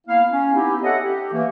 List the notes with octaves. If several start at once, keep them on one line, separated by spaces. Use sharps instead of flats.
A#3 B3 E4 F5
C#4
B3 C4 D#4 E4 G4
A4 C#5 D#5 E5 F#5
G4
E3 A3 A#3